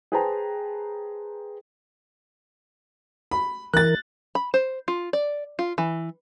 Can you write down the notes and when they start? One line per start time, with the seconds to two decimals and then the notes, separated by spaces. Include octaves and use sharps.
0.12 G#4 B4 C5 G5 A5 A#5
3.31 B5
3.74 E3 A#4 F#6 A6
4.35 B5
4.54 C5
4.88 F4
5.13 D5
5.59 F4
5.78 E3